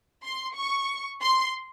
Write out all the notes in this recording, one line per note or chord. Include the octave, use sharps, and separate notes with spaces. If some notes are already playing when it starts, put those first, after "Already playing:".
C6
C#6
C6